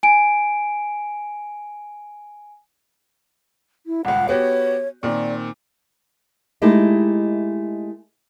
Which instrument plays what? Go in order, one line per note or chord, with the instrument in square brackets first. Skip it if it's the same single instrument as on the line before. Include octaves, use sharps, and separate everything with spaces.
[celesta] G#5 D7
[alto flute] E4
[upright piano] D#1 C#2 [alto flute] F#5
[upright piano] B3 F#4 G4 [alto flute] C#5
[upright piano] A#2 D#3 C4 [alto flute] D5
[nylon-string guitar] G#3 A3 D#4 E4 G4 G#4